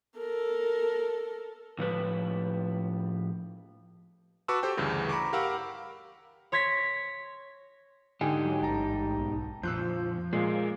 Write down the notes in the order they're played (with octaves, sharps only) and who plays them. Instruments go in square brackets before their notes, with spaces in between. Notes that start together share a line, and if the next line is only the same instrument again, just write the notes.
[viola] A4 A#4
[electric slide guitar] A2 F3 B4
[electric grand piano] F#4 B4 A5 C#6 D6 E6
G4 A4 C5 G5
D2 G2 C#3 E3
A#5 B5 C#6 D6
G4 A#4 F5 F#5 B5 E6
[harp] C#5 C6 G#6 A#6 B6
[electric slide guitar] G#2 D#4 G4 [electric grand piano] D3 G5 G#5
[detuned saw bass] F#3
[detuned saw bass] A1 [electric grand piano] G5 A5 A#5
[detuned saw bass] B1
[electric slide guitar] F2 A#2 [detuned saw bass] F3 [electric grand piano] E6 F#6 G6
[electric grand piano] A#2 G#3 D#5 [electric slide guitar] A#3